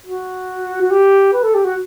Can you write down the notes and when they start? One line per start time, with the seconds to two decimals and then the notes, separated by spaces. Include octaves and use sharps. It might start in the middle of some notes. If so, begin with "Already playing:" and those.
0.06 F#4
0.81 F#4
0.91 G4
1.34 B4
1.43 A4
1.54 G4
1.65 F#4